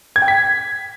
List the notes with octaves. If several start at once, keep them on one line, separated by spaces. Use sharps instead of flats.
G#6
G5
B6